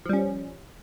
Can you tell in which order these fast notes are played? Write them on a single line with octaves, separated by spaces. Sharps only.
F3 G3 C#4